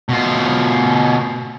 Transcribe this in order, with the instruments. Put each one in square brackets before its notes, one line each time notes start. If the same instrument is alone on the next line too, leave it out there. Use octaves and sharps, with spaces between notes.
[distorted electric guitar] B2 F4